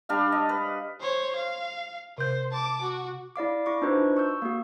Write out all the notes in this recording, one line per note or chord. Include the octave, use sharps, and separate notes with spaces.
G3 D4 F5
D#5
B4
C5 C#5
F5
C3 C5 G6
A5 D6
F#4
E4 D5 F5 D6
E4 C#6 D6
D4 D#4 F4 F#4 B4 C5
C#6 E6 G6
A#3 F#4